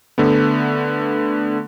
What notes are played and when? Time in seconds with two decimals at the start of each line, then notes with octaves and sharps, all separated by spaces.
0.18 D3 A3 B3